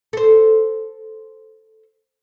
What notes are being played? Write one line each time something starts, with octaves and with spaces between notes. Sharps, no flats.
A4 C5